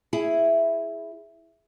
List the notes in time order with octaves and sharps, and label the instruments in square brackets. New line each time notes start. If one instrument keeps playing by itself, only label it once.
[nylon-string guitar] E4 G#4